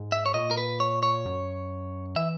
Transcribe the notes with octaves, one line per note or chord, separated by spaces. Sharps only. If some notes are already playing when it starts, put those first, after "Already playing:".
Already playing: G#2
E5
C#5
A#2 D#5
A#4
B4
C#5
C#5
F#2
E3 E5